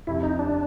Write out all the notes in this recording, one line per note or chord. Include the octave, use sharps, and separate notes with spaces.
F1 F2 C3 E4
D#4
D4